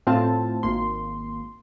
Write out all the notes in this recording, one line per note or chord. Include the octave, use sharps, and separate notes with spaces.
A2 C4 F4 A5
G#1 A#3 C6